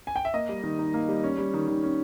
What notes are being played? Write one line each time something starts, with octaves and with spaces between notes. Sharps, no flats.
G#5
G5
E5
A#3 D#5
G3
D#3
D#4
A#3
G3
C#4
G3
D#3
D#3
C#4